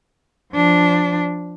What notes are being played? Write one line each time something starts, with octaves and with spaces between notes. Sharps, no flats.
F3 D4